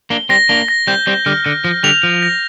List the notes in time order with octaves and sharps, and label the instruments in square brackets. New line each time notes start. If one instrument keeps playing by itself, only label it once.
[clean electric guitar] A#3 D4 [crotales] G7
[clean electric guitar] G3 C4 [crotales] A#6
[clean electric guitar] A#3 D4 [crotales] G7
[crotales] A#6
[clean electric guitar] G3 C4 [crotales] G6
[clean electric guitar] G3 C4 [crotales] A#6
[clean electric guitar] D3 G3 [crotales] F6
[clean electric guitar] D3 [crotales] A#6
[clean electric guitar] F3 [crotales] A#6
[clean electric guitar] D3 G3 [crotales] F7
[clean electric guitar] F3 [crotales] F7
[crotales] A#6